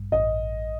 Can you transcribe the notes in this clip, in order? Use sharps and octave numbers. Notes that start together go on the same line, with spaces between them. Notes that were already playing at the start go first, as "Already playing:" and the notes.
Already playing: A1 G2
A1 D#5